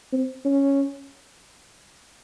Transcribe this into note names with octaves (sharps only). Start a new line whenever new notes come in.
C4
C#4